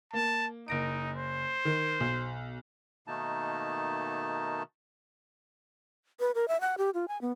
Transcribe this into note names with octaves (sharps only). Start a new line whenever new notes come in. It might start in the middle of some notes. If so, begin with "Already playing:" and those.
A#3 A5
F#1 D#4 A#6 D7
C5
D#3
B1
B2 D#3 A3 A#3 D#4 A5
B4
A#4
E5
F#5
G4
F4
G#5
B3